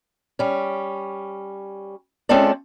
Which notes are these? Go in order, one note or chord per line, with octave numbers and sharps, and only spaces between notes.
G3 C#4
G#3 C4 C#4 F4 A4 D5